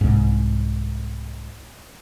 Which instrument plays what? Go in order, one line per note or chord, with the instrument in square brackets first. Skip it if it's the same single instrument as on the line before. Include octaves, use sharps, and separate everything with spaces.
[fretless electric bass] C2 G#2